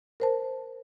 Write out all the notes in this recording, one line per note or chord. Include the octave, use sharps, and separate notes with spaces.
A#4 C5 A5